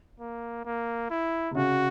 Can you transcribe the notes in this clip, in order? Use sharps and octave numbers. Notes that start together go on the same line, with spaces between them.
A#3
A#3
E4
C3
C#3 F#4